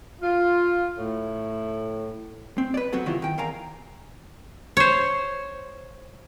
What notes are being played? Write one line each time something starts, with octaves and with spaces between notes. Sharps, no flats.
F4
A2
C4
B4 D5
F#3 B3 C4 F#4 A4
C3 D#3 E3 F#3 E4 F4
D#3 G5
E2 A#4 F5 G#5 A#5
C5 C#5